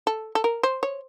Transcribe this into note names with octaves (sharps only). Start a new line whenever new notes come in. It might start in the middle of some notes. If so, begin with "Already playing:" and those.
A4
A4
A#4
C5
C#5